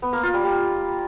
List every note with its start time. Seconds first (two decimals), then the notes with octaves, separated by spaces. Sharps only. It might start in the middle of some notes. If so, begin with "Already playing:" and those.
0.02 B3
0.13 A#3
0.23 F4
0.34 G3
0.44 G3